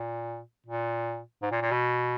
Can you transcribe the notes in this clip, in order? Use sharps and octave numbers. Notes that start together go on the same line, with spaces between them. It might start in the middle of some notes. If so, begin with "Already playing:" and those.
Already playing: A#2
A#2
G#2
A#2
A#2
B2